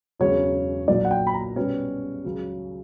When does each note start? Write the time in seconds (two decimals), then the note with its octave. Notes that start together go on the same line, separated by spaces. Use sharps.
0.19 E1 E2 C#3 F#3 C#4 C#5
0.88 B1 A#2 F#3 D5
1.05 F#5
1.11 G5
1.27 B5
1.34 A#5
1.56 B2 G3 C#4 G4 B4
2.24 C#2 C#3 F#3